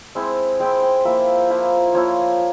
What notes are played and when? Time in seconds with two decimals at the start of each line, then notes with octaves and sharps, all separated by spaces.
0.15 G#3 C4 E4
0.60 G#3 C4 E4 G5
0.82 G5
1.05 F3 A#3 E4 E5
1.50 F3 A#3 E4
1.94 F3 A#3 E4 C#5